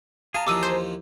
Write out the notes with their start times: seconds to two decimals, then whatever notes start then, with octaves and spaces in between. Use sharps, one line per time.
0.34 F4 G#4 A5 A#5
0.47 D#2 E3 F3 D6 E6 D#7
0.63 C5